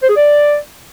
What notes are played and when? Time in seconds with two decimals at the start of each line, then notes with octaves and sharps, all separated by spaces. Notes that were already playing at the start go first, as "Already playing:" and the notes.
0.02 C5
0.09 G#4
0.17 D5